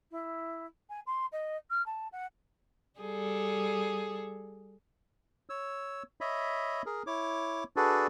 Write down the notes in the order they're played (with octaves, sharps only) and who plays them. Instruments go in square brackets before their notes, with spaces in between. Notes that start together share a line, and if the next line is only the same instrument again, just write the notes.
[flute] E4
G#5
C6
D#5
F6
A5
F#5
[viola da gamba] G3 G#4 A4
[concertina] C#5 E6
C#5 D#5 E5 B5
G#4 A#4
E4 C#5 D6
D4 F#4 G#4 A4 B4 D5